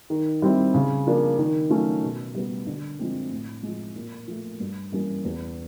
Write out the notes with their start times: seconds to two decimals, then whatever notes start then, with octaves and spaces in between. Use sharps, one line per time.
0.10 D#3
0.42 G3 C4 E4
0.74 C#3
1.07 F3 A#3 D4
1.38 D#3
1.70 F#3 A3 C#4 F4
2.03 B2
2.35 G3 B3
2.67 D3
2.99 F3 G#3 C4
3.31 A2
3.63 F3 G#3
3.96 A#2
4.28 F3 A3
4.60 G2
4.92 E3 G3 A#3 C#4
5.25 E2